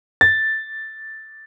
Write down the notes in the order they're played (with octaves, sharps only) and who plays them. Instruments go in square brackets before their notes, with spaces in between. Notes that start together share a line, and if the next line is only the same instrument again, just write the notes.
[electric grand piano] A6